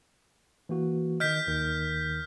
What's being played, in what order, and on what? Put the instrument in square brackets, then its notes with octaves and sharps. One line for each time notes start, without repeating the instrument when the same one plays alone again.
[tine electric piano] E3 A#3 F#4
[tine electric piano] D#3 D#5 [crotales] F6 G6 B6
[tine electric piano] D#2 D#3